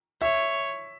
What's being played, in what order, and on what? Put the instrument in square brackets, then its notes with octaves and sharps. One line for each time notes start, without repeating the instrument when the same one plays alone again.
[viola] C#5 [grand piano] E5